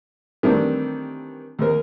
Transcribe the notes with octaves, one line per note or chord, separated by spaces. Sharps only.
D#3 E3 G3 A3 C4 D4
D#2 A#4